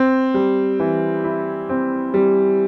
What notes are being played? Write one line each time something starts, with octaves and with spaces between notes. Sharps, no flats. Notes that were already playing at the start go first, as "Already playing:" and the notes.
Already playing: C4
G3
E3
E4
C4
G3